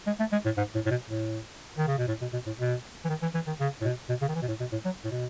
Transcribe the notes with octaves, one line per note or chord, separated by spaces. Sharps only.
G#3
A3
G#3
A2
G#2
A2
A2
B2
A2
D#3
C#3
B2
A2
B2
B2
A2
B2
E3
D#3
E3
E3
D#3
C#3
A2
B2
B2
C#3
D#3
E3
B2
A2
B2
A2
F#3
A2
B2